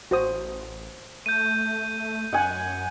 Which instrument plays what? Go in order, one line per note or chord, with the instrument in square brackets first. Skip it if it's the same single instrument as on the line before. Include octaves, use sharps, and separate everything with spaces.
[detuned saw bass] A1 [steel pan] F#4 C5 D#6
[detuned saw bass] A3 [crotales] G6 D#7
[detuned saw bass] F#2 [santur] F#5 G#5